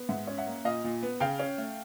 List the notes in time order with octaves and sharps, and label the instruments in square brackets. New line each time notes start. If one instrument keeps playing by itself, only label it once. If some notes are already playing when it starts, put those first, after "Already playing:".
Already playing: [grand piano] B3
G#2 E5 F#5
C#4
E5 F#5
A#3
A#2 D#5 F5
A#2
B3
C#3 F5 G5
C#4
A3